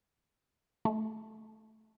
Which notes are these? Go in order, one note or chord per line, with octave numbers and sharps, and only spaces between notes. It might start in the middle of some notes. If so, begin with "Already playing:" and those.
A3